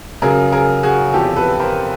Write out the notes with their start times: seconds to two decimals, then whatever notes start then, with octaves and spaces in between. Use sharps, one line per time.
0.22 F#2 C#3 F#3 G#4 A#4
0.52 G#4 A#4
0.83 F#4 G#4
1.14 E2 C3 F3 G4 A4
1.37 A4 B4
1.59 A#4 C5